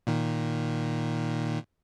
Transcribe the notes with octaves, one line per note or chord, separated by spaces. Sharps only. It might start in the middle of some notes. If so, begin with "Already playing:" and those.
A#2 D#3